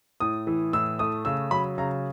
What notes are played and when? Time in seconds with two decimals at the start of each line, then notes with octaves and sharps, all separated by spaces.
0.20 A2 D#6
0.47 E3
0.73 A2 E6
0.99 A3 D#6
1.25 C#3 E6
1.51 F#3 B5
1.78 C#3 A#5